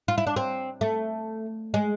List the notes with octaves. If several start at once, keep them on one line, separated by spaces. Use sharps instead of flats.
F4
E4
D4
C4
A3
G#3